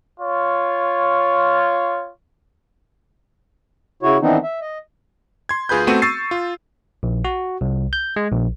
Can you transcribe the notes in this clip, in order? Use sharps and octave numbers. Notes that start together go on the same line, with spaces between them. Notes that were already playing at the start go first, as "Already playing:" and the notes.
F4 C#5
C#3 E4 F#4 C#5
D#3 E3 B3 C4 D4 D#4
E5
D#5
C6 G#6
D2 F4 G#4 B4 B5 G6
A3 B3 C4 F#4 D#7
C#6 E6 A6 C7
F4
A#1
F#4
C2
G6
G#3
A#1